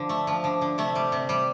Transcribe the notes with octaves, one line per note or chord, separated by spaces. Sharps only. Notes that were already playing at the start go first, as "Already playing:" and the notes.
Already playing: D3 F3
A3
F3
D3
D3
C3 A3
G3
C3
G3